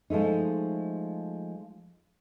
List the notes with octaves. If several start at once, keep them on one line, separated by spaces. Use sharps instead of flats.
F3 G#3 A3 D#4